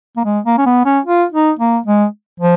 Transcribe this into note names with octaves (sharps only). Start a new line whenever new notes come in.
A#3
G#3
A#3
C#4
B3
C#4
F4
D#4
A#3
G#3
F3